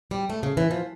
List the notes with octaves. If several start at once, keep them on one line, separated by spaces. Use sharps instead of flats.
G3
A3
C#3
E3
F3